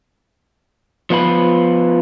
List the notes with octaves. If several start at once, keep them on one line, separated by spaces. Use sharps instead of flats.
F3 B3 F4 B4